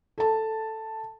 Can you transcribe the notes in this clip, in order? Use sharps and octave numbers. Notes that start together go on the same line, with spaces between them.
A4 A5